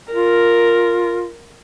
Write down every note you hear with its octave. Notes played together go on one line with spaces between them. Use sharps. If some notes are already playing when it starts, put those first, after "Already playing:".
F4 A#4